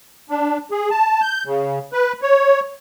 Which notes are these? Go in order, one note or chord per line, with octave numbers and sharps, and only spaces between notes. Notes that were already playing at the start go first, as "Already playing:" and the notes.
D4
G#4
A5
G6
C#3
B4
C#5